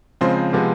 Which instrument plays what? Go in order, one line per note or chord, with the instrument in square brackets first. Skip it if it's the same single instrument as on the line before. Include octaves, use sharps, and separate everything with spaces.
[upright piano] C#3 F3 G#3 C4 C5
C3 F3 G#3 B3